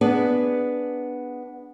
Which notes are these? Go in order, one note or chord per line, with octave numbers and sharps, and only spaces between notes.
B3 D4 G#4 B4 D5